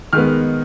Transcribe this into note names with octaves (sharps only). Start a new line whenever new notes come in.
D#3 G#3 B3 F6